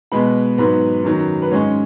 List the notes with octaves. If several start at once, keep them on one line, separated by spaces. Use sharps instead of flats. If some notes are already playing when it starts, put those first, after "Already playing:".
B2 G#3 B3 B5
G#2 F#3 B3 B4
F#2 D#3 F#3
B4
G#2 G#3 C#4 C#5